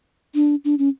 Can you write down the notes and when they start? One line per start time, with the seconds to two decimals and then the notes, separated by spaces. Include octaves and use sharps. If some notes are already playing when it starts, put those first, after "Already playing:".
0.35 D4
0.65 D4
0.79 C#4